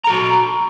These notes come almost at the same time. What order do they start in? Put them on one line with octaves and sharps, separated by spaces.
A#5 A4 F#4